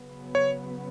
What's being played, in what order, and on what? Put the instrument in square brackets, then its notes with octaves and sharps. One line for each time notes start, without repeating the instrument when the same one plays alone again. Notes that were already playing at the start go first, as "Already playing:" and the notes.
Already playing: [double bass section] C#3 F#3 B3
[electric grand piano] C#5